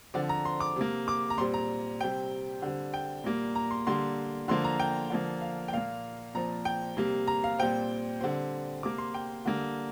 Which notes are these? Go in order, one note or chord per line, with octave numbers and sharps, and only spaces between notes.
D3 F3 C4 D5
A#5
C6
D6
C3 A#3
D6
A#5
A#2 G3 C4 C6
A#5
C3 G3 C4 G5
D3 G3 C4
G5
A#2 G3 A#3
A#5
C6
D3 G3 A#3 C6
D3 F3 A#3 C6
A#5
G5
D3 F3 A#3
F5
G5
A#2 A#3 F5
A#2 F3 C4 A#5
G5
C3 G3 A#3
A#5
F5
A#2 G3 C4 G5
D3 G3 C4
C3 A#3 D6
C6
G5
D3 G3 A#3